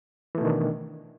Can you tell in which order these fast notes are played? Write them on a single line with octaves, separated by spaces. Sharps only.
E3 A3 B2 D#3 D4